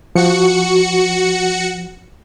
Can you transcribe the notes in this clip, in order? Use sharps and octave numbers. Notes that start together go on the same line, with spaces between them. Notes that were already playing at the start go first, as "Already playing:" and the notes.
F3 F#4 C#7